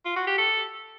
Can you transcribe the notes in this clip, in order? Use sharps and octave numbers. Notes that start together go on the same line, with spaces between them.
F4
F#4
G4
A4